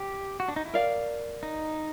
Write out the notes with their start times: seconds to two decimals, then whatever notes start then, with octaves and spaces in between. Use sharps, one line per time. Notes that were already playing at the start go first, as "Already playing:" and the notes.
Already playing: G4
0.40 F#4
0.48 D4
0.56 D#4
0.65 E4
0.74 A#4 D5 F5
1.43 D#4